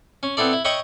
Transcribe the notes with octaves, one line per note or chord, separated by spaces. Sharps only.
C#4
B3 C4 E4 A4 D5
E4
C#5 D#5 E5 G5 B5 C#6